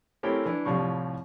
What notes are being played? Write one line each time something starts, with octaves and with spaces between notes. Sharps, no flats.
A3 C4 C#4 E4 G4 A#4
E3 D4 D5
C2 A2 F3 G3 C#6